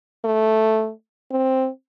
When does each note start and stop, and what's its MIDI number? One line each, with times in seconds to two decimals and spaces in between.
0.25 0.91 57
1.31 1.68 60